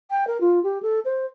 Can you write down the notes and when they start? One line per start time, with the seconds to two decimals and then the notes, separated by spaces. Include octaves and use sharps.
0.10 G5
0.27 A#4
0.41 F4
0.63 G4
0.82 A4
1.05 C5